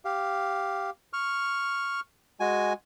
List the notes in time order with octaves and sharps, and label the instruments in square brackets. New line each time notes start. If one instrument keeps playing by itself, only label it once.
[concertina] G4 F5
C#6 F6
G#3 F#4 G#5